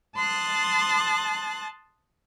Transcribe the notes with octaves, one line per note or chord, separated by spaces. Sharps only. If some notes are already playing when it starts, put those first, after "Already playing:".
A5 C6 D#6 F#6 A6